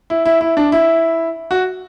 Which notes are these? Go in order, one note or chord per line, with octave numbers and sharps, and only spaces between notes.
E4
E4
E4
D4
E4
F#4